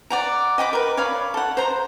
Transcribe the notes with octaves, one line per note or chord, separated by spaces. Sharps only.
D5 F#5 A#5
D#5 G5 B5 D6
A#4 B4
C#5 D5 F5 B5
A4 F#5
C5 A#5